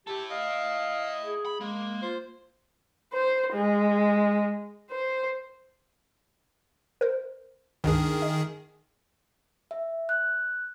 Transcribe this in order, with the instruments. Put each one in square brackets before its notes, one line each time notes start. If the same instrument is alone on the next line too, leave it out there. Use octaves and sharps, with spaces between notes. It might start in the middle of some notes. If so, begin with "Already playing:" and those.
[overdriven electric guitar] E4 A4 [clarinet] G4 [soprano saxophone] A5
[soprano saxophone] D#5 [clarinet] F5
[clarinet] G#4
[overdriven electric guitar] B5
[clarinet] G#3 [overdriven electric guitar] A#3
[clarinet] F4 [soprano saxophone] C5
[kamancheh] C5
G#3
C5
[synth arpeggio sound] A#4 C5
[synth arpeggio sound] C#2 G2 D4 [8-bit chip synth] D#3 G#4
[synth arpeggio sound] D#5
[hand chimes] E5
F#6